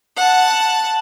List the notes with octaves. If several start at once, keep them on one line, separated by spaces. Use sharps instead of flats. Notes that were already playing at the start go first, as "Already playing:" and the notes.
F#5 A5